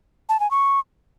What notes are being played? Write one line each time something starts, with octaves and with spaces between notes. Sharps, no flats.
A5
G#5
C#6